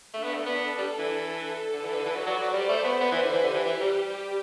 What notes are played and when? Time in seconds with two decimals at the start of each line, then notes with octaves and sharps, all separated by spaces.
0.14 A3 D4
0.23 B3
0.34 A3
0.45 B3 A4
0.77 G3 A4
0.98 E3
1.73 D3 B4
1.84 E3
1.94 D3
2.06 E3 D5
2.16 F#3
2.26 F#3
2.37 F#3 C5
2.53 G3
2.69 A3 C5
2.84 B3
3.01 B3 B4
3.12 E3
3.23 D3
3.33 E3 G4
3.44 D3
3.54 E3
3.65 E3
3.81 G3